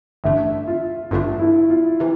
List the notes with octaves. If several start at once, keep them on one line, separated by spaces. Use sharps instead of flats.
A1 G2 D3 A3 D4 E5
F4
A1 G2 D3 A3 D4 F4
E4
F4
C3 E3